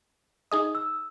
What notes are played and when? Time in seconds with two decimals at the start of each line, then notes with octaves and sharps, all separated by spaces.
0.52 D#4 G#4 D#5 D#6
0.75 E6